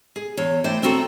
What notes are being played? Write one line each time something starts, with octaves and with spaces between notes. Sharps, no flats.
G#4
E2 C#5
E3 A3 C5 D5 G5
B3 C4 E4 F#4 A4 A#5